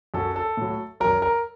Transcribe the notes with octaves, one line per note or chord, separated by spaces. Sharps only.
F#2 F#3 A4
A4
A2 F#3
F#2 F#3 A#4
A#4